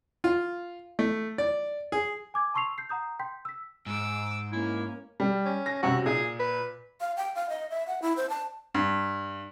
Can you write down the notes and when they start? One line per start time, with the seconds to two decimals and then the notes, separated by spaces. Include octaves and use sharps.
0.24 F4
0.99 A3
1.38 D5
1.92 G#4
2.34 G#5 D6 G#6
2.54 A5 C6 C#6 E6 C7 F7
2.78 G6 C7
2.89 F#5 A#5 D#6 G6
3.19 G5 C6 G6 B6
3.45 E6 B6
3.86 G#2 D6 E6
4.52 A#3 C#4 E4
5.20 G3
5.46 C#4
5.66 A#6
5.83 F#2 C3 F#4
6.06 A#2 G#4
6.39 B4
7.01 F5
7.17 G5
7.35 F5
7.49 D#5
7.70 E5
7.87 F#5
8.02 E4
8.17 C5
8.30 A5
8.75 G2